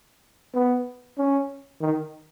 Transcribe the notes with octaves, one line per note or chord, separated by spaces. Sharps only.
B3
C#4
D#3